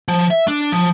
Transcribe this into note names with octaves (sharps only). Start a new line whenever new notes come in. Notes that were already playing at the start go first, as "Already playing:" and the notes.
F3
E5
D4
F3